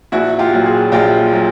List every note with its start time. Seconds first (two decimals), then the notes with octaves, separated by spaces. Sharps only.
0.12 A#1 E4 F#4
0.39 F4 G4
0.53 A#2 F#3
0.66 F#4 G#4
0.92 A#1 F4 G4
1.33 A#2 F#3